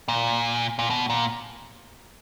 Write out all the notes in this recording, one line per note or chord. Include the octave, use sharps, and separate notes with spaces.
A#2
A#2
B2
A#2